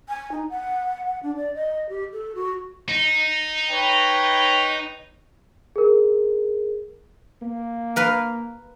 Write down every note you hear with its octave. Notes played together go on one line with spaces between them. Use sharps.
G#5
D#4
F#5
D4
D5
D#5
G4
A4
F#4
D#4
B4 C#5 G5
G#4 A#4
A#3
A#4 B4 F5